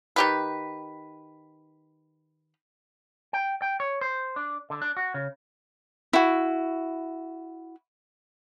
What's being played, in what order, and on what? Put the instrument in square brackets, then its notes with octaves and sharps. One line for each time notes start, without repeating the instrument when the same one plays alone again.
[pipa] D#3 G4 B4
[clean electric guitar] G5
G5
C#5
C5
D4
D3
D4
F#4
C#3
[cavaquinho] E4 F#4